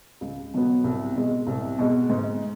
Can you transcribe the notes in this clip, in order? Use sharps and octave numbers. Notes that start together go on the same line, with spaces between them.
C#2
B2 F#3 B3
C2
B2 G#3
C2
B2 G#3
G#2